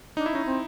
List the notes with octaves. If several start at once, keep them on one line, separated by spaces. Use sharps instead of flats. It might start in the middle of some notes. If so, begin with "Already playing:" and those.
D4 D#4
E4
C#4 D#4
C4